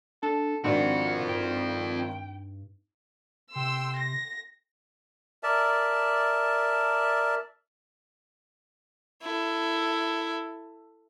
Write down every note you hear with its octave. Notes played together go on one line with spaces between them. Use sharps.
D4 A4
G#1 B2 C4 D4 F4 F#4 F#5
G2 G5
C3 G5 C6 E6
A#6
A#4 D5 E5 A5
E4 A4